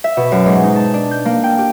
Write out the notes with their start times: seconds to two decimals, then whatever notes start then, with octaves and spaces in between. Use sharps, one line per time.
0.04 E5
0.17 B2
0.32 F#2
0.46 G#2
0.63 D#4
0.76 A5
0.94 D4
1.11 G6
1.25 A#3
1.44 G5
1.58 G4